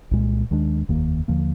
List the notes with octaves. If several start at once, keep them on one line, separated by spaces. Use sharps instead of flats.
C2 A#2 G#3
D#2 D#3 G#3 D4
F1 D#2 D#3 A#3
D#2 D3 F3 A#3